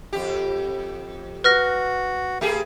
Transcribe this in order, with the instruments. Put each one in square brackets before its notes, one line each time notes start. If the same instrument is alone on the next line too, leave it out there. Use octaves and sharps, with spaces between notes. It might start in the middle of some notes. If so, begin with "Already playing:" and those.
[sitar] F2 G4
[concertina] F#4 [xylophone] B4 F6 A#6
[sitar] A3 G4 G#4